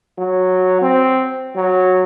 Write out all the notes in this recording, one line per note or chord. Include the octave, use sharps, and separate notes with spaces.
F#3
C4
F#3